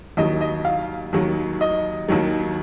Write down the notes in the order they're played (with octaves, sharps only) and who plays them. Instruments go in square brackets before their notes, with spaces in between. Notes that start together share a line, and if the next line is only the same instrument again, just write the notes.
[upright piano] D#2 D#3 F#3 D#5
D#5
F5
D#2 D#3 F#3
D#5
D#2 D#3 F#3